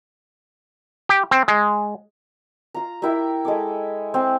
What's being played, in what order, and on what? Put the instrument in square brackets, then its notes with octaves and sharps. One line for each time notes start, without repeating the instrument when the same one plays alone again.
[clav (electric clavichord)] G4
C4
G#3
[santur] F4 A#5
E4 G4 A#4 E5
G#3 A4 D6
C4